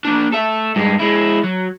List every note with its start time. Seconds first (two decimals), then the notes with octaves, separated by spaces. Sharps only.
0.05 A#3 D4
0.32 A4 E5
0.76 G2 G#3
1.00 G#3 E4
1.44 F#3